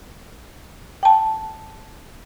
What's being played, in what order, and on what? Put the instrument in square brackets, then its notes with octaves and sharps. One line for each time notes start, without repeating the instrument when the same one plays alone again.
[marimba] G5 A5